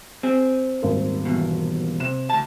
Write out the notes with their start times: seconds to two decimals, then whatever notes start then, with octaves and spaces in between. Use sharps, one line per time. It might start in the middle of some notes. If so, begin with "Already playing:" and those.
0.23 C4 G#4
0.82 D#1 G#1 A#4
1.25 E2 B2
2.00 C3 E7
2.30 D2 A5